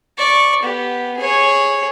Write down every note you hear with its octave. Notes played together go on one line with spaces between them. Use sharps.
D5 C#6
B3 G4
G#4 C#5